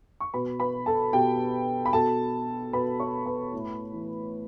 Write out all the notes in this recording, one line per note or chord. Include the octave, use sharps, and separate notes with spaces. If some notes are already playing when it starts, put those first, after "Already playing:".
C#6
B2 B4 B5
B4 B5
A4 A5
B2 G4 G5
B5
B2 A4 A5
B2 B4 B5
C#5 C#6
B4 B5
A2
E3